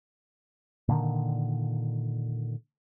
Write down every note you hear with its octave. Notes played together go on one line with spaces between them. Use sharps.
A#2 D3 D#3